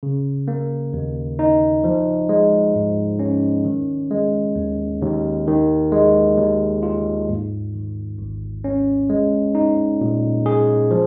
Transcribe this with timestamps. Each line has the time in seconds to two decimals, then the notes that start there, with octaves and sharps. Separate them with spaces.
0.03 C#3
0.48 A#3
0.93 D#2
1.39 D#4
1.84 F3
2.29 G#3
2.75 G#2
3.19 C#4
3.65 D#3
4.11 G#3
4.56 D#2
5.02 D#2
5.47 D#3
5.92 G#3
6.37 D#2
6.83 F4
7.29 G#2
7.74 D#3
8.18 G#1
8.64 C#4
9.10 G#3
9.55 D#4
10.01 A#2
10.46 G#4
10.91 F3